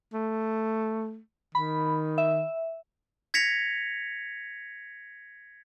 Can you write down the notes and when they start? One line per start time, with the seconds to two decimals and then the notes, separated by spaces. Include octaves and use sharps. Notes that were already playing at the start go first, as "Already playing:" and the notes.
0.14 A3
1.55 D#3 B5
2.18 E5
3.34 G#6 A#6 B6 C#7 F7